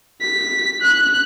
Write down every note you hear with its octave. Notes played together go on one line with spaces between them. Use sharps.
B6
F#6